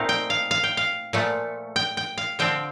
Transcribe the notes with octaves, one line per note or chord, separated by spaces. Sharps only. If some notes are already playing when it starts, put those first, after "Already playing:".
Already playing: A#2 A3 C4 D#4 F5
G5
F5
F5
G5
F5
A#2 F3 A3
G5
G5
F5
D3 F3 C4 G5